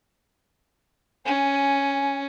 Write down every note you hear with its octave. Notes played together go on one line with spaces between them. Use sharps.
C#4 G#5